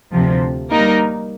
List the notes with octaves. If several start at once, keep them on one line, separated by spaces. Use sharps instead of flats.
D2 C3 F3
G3 A#3 D#4 A#4